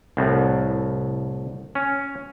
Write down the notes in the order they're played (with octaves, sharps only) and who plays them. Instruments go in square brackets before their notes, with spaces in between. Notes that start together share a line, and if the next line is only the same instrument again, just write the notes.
[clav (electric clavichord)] C2 A2
C#4